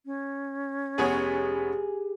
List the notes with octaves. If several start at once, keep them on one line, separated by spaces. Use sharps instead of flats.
C#4
F1 B3 G4 G#4 C#5